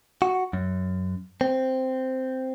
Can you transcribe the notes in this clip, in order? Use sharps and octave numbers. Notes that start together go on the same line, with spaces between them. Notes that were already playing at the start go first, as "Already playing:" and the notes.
F#4
F#2
C4